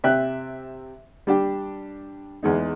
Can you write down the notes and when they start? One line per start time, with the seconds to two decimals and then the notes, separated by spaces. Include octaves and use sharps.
0.04 C3 E5 G5 F#6
1.27 G3 D4 G4
2.43 E2 G#3 D#4